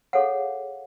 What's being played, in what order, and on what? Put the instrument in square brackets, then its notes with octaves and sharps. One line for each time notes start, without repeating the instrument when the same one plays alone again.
[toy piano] G#4 A4 C#5 F5 F#5